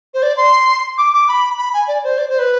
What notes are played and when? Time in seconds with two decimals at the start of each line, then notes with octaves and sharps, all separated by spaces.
0.14 C5
0.23 D5
0.37 C6
0.98 D6
1.14 D6
1.28 B5
1.58 B5
1.74 G#5
1.88 D5
2.04 C5
2.18 D5
2.29 C5
2.39 B4